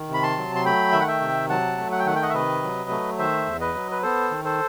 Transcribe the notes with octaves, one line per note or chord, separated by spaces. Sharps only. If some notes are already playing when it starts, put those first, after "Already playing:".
Already playing: D#3
C3
B5
A5 C6
F#3
C6
A3 G5 B5
D#3 E5
F#5
E5 G5
C3
F#3 F#5 A5
A3
F#5
G5
D#3 F#5
G5
D#5 F#5
E5
C3 B4 D#5
F#3
A3
D#3 C5 E5
E2
B4 D#5
F#3
B4
B3 A4 C5
D#3
A4 C5